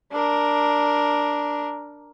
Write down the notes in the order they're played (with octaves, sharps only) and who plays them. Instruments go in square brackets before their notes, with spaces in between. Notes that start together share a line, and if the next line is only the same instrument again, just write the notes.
[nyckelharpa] D4 A#4